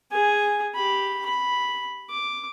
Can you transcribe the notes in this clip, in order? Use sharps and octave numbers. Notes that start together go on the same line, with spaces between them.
G#4 G#5
G4 B5
B5
D6